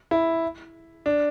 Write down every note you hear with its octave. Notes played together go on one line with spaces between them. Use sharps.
E4
D4